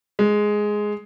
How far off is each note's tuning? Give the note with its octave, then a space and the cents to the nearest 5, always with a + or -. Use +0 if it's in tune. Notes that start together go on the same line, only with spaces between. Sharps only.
G#3 +5